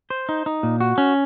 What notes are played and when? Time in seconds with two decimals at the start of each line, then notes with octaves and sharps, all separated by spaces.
0.10 C5
0.29 D#4
0.46 D#4
0.63 A#2
0.80 F#4
0.98 C#4